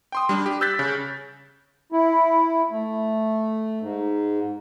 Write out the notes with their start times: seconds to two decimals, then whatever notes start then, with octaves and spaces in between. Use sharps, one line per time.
0.12 G5 C6 D#6
0.29 G3 D4
0.46 G4
0.61 E6 F#6 G6 A6 B6
0.79 C#3
1.92 E4
2.71 A3
3.81 G#2